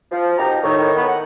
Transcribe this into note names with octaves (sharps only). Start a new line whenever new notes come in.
F3
B2 D#4 G4 A#5
A2 D#3 C#5
B3
F#5